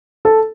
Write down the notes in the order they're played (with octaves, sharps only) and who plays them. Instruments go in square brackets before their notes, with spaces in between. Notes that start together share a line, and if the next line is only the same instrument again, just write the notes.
[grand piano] A4